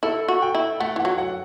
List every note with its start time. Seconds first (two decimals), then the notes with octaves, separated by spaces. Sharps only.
0.03 E4 A4
0.28 F#4
0.42 G5
0.55 E4
0.80 A3 F#5
0.96 E3 F#5
1.05 F#3
1.18 F#5